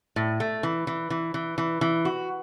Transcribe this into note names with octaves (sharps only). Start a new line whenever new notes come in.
A2
A3
E3
E3
E3
E3
E3
E3
F#4